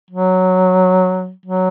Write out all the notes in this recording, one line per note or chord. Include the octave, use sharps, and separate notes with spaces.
F#3
F#3